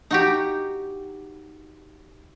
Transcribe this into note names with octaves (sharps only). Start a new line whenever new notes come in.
D#4 F#4 G4